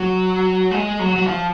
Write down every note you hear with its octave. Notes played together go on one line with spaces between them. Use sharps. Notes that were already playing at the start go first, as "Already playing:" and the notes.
Already playing: F#3
G#3
F#3
F#3
F3